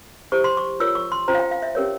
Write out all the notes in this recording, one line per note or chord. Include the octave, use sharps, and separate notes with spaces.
E4 G4 C5 C#6
C6
C#6
F4 A#4 C#5 E6
C#6
C6
C#4 F4 C5 A#5
F5
G5
F5
E5
C#4 G4 A#4 C#5